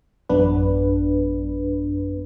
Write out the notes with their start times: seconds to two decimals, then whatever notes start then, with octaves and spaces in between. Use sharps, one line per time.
0.29 A1 F#2 B3 D4 B4